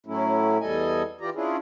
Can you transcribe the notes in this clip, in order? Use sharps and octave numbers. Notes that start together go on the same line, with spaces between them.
A2 F#3 A3 C#4 E4
E2 G3 A4 D#5 G#5
E3 F4 G4 D5 A#5
C#4 D4 E4 F4 G#4